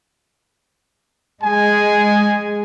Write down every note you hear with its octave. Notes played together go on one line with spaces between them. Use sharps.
G#3 G#4 G#5